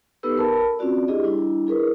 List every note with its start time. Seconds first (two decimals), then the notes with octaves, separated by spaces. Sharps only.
0.23 B3 D#4 G4 A4 B4 E6
0.38 A#4 A5 B5
0.79 C4 C#4 F4 F#4 D5
1.08 D4 E4 G4 G#4 D#5
1.24 G3 D4 E4
1.67 E4 G#4 A#4 B4